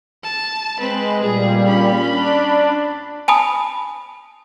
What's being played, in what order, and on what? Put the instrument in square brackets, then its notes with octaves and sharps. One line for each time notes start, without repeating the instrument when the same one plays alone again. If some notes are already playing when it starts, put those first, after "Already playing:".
[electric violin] A5
[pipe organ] G#3 [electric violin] C4 B4
[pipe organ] A#2 G3 [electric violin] G#4
[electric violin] C#4 B5
[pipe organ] D4
[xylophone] G#5 A5 B5 D#6